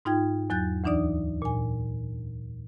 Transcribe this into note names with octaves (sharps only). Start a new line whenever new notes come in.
G#2 D#4 F4 G5 G#6
E2 F#3 F#6 G6 A6
D2 E3 D4 D#4 D5 D#6
A#2 G#5